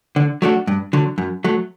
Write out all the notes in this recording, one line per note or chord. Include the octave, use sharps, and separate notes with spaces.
D3
F#3 A3 D4 F#4
G2
D3 F#3
F#2
F#3 A3